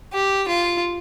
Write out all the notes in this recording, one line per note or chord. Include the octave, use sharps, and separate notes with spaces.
G4
F4